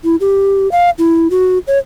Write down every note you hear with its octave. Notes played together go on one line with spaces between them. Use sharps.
E4
G4
F5
E4
F#4
C#5